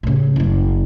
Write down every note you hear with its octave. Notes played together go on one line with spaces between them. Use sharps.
A2 C#3
F#1 F#2